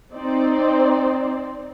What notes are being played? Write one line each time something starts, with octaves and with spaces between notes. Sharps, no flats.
C4 D#4 C5 D5